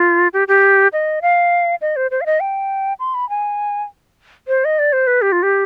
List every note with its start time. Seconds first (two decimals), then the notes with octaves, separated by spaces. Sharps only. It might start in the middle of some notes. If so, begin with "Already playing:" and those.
Already playing: F4
0.33 G4
0.48 G4
0.93 D#5
1.22 F5
1.81 D#5
1.96 C5
2.11 C5
2.21 F5
2.26 D#5
2.40 G5
3.00 C6
3.15 B5
3.30 G#5
4.48 C5
4.65 D#5
4.79 D5
4.93 C5
5.07 B4
5.22 G4
5.32 F4
5.43 G4